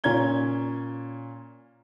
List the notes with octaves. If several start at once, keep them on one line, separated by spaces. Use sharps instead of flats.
A#2 C#4 A#5 G#6 G7